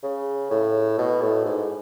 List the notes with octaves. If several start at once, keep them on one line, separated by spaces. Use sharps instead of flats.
C#3
A2
B2
A2
G#2